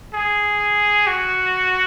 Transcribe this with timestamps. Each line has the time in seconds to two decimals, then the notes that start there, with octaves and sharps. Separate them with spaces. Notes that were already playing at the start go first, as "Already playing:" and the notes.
0.14 G#4
1.07 F#4